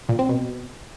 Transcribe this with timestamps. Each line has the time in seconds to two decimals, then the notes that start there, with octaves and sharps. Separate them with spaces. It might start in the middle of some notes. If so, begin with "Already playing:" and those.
0.09 A#2
0.19 C4
0.29 B2